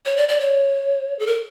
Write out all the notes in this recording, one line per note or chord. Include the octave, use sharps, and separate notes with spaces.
C#5
D5
D5
C#5
A4
A#4